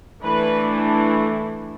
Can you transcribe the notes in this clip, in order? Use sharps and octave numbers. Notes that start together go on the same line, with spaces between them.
E3 A3 D4 B4